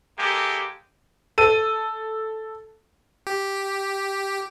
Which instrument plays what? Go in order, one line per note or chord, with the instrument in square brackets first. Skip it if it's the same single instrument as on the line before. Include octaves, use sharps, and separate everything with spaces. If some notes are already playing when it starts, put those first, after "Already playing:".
[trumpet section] G#3 A#3 G4 A4
[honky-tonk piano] A4 D#7
[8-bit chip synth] G4